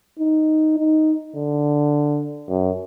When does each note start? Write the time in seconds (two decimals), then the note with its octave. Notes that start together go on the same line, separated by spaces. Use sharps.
0.19 D#4
0.78 D#4
1.36 D3
2.49 F#2